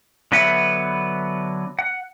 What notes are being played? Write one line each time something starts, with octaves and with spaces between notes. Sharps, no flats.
D3 F#3 B3 B4 E5 F#5
F#5